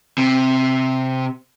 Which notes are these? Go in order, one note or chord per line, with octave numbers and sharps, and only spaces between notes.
C3